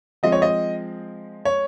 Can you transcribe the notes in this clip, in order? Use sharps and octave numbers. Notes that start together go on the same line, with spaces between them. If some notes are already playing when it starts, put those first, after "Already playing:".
F3 G#3 C4 D#5
C#5
D#5
C#5